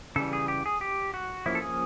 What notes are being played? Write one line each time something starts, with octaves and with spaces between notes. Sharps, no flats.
C#3 E3 G3 A4
G#4
G4
G#4
G4
F#4
F3 A#3 C#4 E4
A4
G#4